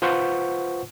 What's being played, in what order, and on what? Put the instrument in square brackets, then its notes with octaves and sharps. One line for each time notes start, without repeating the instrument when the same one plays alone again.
[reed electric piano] F4 B4 C5 F#5 C#6 G6